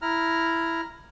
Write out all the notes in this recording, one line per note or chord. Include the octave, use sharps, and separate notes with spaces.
E4 A#5 F6